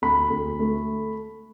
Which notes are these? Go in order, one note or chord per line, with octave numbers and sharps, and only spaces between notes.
D2 B5
D2
A3